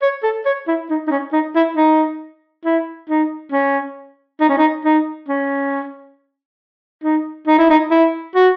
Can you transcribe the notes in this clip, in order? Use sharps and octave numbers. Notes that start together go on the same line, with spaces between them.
C#5
A4
C#5
E4
D#4
D#4
C#4
D#4
E4
D#4
E4
D#4
C#4
D#4
C#4
D#4
D#4
C#4
D#4
D#4
E4
D#4
E4
F#4